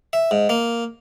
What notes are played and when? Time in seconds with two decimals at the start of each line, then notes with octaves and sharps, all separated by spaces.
0.13 E5
0.31 G#2
0.49 A#3